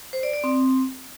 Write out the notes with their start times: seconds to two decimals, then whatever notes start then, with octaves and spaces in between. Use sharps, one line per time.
0.13 C5
0.23 D5
0.33 D5
0.44 C4